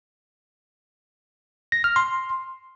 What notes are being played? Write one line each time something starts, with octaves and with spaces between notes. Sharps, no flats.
A#6
F6
C6